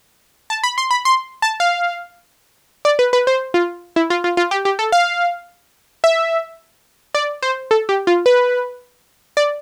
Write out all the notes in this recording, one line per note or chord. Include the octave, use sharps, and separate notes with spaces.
A5
B5
C6
B5
C6
A5
F5
D5
B4
B4
C5
F4
E4
F4
F4
F4
G4
G4
A4
F5
E5
D5
C5
A4
G4
F4
B4
D5